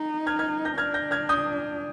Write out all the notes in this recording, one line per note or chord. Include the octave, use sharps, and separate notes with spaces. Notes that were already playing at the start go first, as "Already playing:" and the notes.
Already playing: D#4
F6 G#6
F6 G#6
G6 A#6
D4 F6 G#6
G6 A#6
F6 G#6
D#6 G6